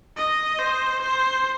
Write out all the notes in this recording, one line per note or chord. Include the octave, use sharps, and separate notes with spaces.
D#5
C5
C5